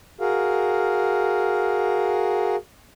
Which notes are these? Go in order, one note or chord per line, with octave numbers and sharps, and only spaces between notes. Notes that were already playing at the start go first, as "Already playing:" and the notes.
F#4 G#4 A#4 F5